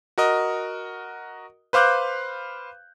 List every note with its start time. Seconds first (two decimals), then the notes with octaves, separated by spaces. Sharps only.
0.18 F#4 A#4 D#5
1.73 B4 C5 F5 D6 F#6 G6